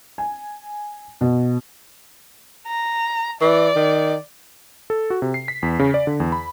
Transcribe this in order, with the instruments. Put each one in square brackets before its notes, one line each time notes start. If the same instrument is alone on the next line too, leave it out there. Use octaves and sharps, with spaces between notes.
[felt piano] G#5
B2
[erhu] A#5
[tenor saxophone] E3 [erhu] D5
[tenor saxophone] D#3
[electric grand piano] A4
F#4
C3
C7
B6
E2
C#3
D5
D3
E2
B5